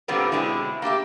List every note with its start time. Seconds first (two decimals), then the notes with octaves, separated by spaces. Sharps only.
0.08 G2 A#2 D3 G3 B3 C4
0.32 B2 D3 G#3 C4 E4
0.82 A#3 D4 G4 E5